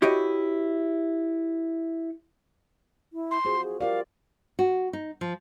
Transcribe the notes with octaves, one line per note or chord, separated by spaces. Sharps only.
E4 F#4 G4 C#5 D#5
E4
C6
F4 F#4 G#4 C5
G#4
F4 G4 A#4 D5 F5
F#4
D#4
F3